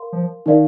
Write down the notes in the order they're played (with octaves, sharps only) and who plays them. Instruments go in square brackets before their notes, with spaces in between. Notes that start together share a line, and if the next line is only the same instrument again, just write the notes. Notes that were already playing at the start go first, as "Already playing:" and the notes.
Already playing: [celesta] A#4 F5 C6
[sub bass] F3
[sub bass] D#3 [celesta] D#4 A#4 D5 F5